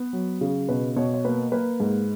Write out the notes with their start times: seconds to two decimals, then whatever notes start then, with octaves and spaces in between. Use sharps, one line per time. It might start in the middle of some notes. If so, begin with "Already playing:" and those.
Already playing: B3 B4
0.13 F#3
0.41 C#3
0.69 B2 B4
0.96 B2 C#5
1.14 C#5
1.25 A#3 B4
1.52 A#3 B4
1.80 G#2